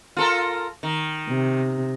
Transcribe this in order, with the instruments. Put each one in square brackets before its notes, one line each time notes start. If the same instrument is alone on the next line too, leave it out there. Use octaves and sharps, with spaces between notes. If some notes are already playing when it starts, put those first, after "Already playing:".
[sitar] F4 A4 A#4
D#3
[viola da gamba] C3